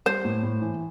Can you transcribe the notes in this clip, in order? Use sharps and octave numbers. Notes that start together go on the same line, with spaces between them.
G3 C5
A2
A2
E3